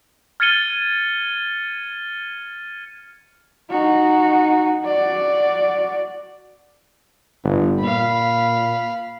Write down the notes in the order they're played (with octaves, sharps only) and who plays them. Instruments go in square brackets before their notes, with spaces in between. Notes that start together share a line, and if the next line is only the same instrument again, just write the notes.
[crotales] F6 G#6 A6 C#7 D#7 G7
[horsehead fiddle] D#4 F#4
F#4 D5
[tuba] G1
[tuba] A#2 [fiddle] F5 B5